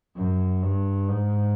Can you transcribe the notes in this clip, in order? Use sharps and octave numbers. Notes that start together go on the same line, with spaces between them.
F#2
G2
G#2